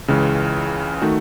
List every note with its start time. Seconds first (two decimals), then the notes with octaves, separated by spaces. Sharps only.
0.08 C#2 C#3 E3 G#3 C#4
1.02 D#3 A3 D#4 F#4